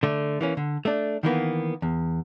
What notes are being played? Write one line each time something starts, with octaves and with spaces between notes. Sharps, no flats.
D3 A3
E3 A#3 C#4
D3
A3 D4
D#3 E3 A#3 B3
E2